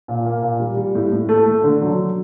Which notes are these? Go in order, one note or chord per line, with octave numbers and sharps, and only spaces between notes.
A#2
A#3
A#2
G3
G3
A2
A2
A3
A3
D3
F#3